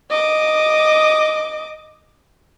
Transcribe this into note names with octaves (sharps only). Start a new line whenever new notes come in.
D#5 D6